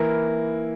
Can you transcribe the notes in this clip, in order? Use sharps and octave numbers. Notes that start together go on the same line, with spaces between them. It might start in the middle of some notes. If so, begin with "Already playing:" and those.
Already playing: E3 A#3 E4 A#4